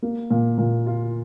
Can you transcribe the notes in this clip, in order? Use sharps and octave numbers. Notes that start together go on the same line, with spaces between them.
A#3
A#2
A#2
F4